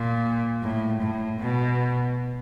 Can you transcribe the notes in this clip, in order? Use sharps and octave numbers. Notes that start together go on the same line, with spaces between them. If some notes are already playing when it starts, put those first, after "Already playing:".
Already playing: A#2
A2
A2
B2